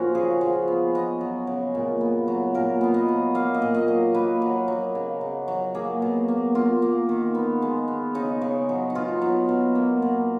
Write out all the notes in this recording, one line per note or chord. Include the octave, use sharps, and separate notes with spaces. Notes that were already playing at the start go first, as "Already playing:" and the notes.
Already playing: A#2 F3 C#4 F#4
C#3 G#4
F3
B3
B3 D#5
F#3
C#3
A#2
B3
F#3
A#2 A#4
B3 F5
D#5
F#3
A#3 F5
D#5
A#2
D#5
F#3
A#3 B4
F#3
F#3
C#3
C#3
F#3
A#3 G#4
B2
A#3
A#3 F4
A#3
D#3
B3
G#3
B3
C#3 D#4
C#3
F#3
D#4
B2 F4
F#3
B2
A#3
B2